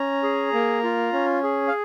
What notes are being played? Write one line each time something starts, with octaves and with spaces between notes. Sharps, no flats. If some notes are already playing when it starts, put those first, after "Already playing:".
Already playing: C#4 A#5
G#4
A#3
F4
C#4
G#4
F5